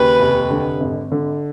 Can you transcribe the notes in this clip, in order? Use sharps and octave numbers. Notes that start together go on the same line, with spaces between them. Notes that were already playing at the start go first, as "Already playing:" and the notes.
Already playing: D#2 C#3 B4
F1
D3
G#1
D3